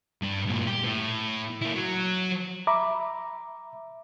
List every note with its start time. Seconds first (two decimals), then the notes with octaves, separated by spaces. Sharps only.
0.22 G2 D4
0.46 G2 A#2
0.67 G4
0.84 A2
1.61 A#3 E4
1.75 F#3
2.67 E5 A#5 B5 D6